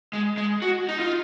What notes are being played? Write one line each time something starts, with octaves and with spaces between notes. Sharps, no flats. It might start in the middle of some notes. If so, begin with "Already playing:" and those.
G#3
G#3
F#4
D#4
F4